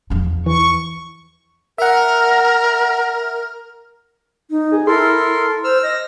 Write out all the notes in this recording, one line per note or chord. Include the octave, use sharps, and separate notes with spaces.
E2 F3
E3 C#6
A#4 E5 F#5
D#4
G#4
E4 A4 A#4 C6
C5 E6 F6
D#5 A#6